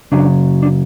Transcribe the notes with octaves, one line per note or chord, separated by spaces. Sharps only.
F#2 C#3 F#3 D4
D4